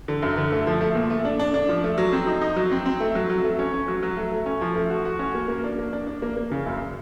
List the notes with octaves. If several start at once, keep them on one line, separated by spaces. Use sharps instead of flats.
D3
F#2
D3
A3
F3
A3
A#2
A3
D4
D4
D4
F3
A3
F#3
C4
D#4
D#4
F#3
C4
C4
A3
F#3
F#3
A3
C#4
C#4
F#3
F#3
A3
A3
C#4
F3
A3
F#4
F#4
C#4
A#3
A#3
D4
A#3
D4
D4
A#3
A#3
C#3
F#2